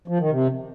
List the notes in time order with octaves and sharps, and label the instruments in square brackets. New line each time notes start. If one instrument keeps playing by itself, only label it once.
[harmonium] F3
D#3
C3